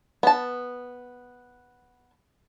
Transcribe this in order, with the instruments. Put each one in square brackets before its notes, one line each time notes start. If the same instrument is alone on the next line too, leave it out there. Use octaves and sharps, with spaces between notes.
[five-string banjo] B3 A5